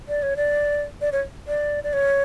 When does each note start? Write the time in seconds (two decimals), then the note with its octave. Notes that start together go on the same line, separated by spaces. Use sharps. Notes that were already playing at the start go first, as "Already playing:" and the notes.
0.09 D5
0.23 C#5
0.37 D5
1.01 D5
1.12 C#5
1.48 D5
1.84 D5
1.93 C#5